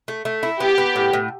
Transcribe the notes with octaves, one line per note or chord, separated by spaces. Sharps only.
A3
A3
E4
B3 G4
B3
A2
A2